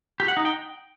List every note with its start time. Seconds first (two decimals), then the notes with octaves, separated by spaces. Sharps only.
0.20 G4
0.28 F#5
0.37 D#4
0.45 G5